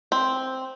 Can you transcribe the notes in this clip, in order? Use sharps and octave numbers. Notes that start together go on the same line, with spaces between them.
C4